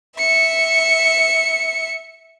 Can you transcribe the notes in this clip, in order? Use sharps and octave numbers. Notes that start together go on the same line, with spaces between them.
E5 C#7